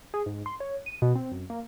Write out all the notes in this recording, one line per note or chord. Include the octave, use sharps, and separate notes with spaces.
G#4
G#2
C6
C#5
D#7
B2
C4
F#2
A#3